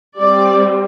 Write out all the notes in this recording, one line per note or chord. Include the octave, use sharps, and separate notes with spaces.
G3 C4 D5